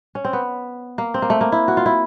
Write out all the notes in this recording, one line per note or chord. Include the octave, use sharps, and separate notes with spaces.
C#4
C4
B3
A#3
C4
A#3
A3
A#3
E4
F#4
F4
E4